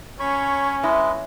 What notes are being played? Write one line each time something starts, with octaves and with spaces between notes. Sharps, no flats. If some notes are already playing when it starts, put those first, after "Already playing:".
C#4 C#5 B5 C#6
G#3 E4 B4 D#5